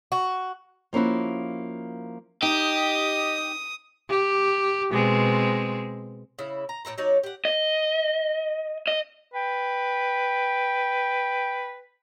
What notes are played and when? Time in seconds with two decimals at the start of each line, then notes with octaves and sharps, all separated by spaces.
0.12 F#4
0.93 F3 A#3 C#4 E4 F#4
2.43 D#4 G4 D#5 D#6
4.10 G4
4.91 B2 G#3 C4
6.39 C#3 E4
6.69 A#5
6.85 A2 E3 A4 A#5
6.98 F#3 D#4 C#5 D5
7.23 G4 F#5
7.45 D#5
8.88 D#5
9.34 B4 G5